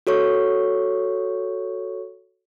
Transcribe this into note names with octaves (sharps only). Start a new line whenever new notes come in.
F#4 A4 C#5 C#6